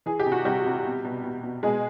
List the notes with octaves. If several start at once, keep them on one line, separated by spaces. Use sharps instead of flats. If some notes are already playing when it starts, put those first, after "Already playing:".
E3 G#4
G4
C3
F#4
C3 G3 G4
C3
B2
B2
B2
B2
B2 G#3 G#4